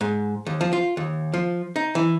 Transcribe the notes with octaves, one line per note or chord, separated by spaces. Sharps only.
G#2
D#2
F3
F4
D#2
F3
D#4
E3